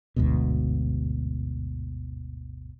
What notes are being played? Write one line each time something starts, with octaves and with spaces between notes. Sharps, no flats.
G1 D2 G#2 B2